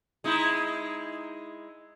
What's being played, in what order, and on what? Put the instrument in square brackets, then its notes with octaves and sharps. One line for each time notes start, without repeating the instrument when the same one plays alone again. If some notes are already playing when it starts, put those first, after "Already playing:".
[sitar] G#3 D#4 E4